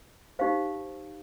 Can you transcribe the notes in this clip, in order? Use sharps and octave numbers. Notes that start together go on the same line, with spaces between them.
D#4 G4 C5 F5